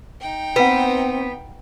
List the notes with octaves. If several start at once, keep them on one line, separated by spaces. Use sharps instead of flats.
D#4 G5
B3 C4 B4 F#5